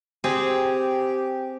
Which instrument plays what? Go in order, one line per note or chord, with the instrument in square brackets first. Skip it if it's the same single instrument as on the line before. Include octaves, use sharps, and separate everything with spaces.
[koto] C4 G#4 [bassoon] G4